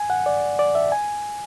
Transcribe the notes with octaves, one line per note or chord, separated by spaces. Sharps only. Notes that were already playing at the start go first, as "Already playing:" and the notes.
Already playing: G#5
F#5
D5
D5
E5
G#5